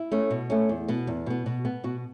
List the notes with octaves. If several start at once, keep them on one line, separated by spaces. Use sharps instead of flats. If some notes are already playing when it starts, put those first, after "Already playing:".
Already playing: E4
A3 C#4
B2
A3 C#4
E2
B2 B3
E2
B2 B3
B2 F#4
B3
B2 F#4